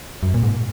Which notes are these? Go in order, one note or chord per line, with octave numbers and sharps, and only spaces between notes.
F#2
A#2
G#2